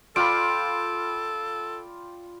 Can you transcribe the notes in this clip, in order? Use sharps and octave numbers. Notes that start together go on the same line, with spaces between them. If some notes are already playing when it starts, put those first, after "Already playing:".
F4 A4 D5 F5 G5 B5 D7